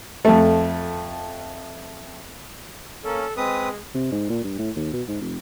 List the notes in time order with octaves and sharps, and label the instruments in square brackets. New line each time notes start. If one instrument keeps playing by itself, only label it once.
[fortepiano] F2 A3
[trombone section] A#3 C#4 [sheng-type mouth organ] A4
[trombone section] G#3 [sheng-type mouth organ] C4 B4 D#6
[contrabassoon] C3
G#2
A#2
G2
A2
D#2
B2
G#2
F1